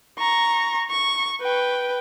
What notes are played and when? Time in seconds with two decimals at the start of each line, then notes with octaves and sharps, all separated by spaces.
0.18 A#5 C#6
0.90 C#6
1.41 B4 G5